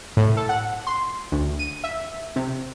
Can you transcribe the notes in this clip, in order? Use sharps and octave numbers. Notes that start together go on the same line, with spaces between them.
A2
A4
F#5
C6
D2
D#7
E5
C3